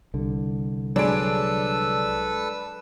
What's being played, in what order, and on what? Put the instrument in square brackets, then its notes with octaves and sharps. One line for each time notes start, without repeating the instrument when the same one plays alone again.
[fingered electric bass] C2 D3
[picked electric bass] F#3 G#3 [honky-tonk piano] D4 D7 [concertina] A4 B4 E6